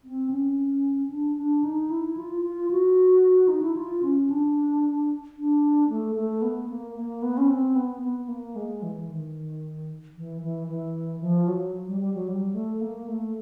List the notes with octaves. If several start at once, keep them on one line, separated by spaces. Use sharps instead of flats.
C4
C#4
D4
D4
D#4
E4
F4
F4
F#4
D#4
E4
F4
C#4
D4
D4
A3
A3
B3
A#3
A#3
B3
C#4
C4
B3
B3
A#3
G#3
E3
D#3
E3
E3
E3
F3
F#3
G3
G3
F#3
G3
A3
A#3
A3